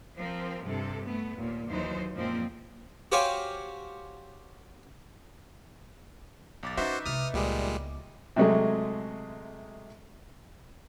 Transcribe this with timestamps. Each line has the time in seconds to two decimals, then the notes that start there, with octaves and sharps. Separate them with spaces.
0.15 F3 C4 A#4
0.63 G2 C3 A4
1.04 A3 B3
1.36 D#2 A#2
1.68 D#2 E3 F#3 D#4 C5
2.15 F#2 A#2 F3 G#3 A#3 C4
3.12 F#4 G4 C5 C#5 F5 G#5
6.63 B1 D6 A6
6.77 C#4 D#4 F#4 B4 C5 E5
7.06 C2 G#3 D#6 F6
7.34 C#2 A#2 G3 G#3 B3
8.36 C3 F#3 G#3 A3